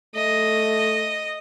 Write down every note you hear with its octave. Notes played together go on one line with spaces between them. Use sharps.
A3 D#5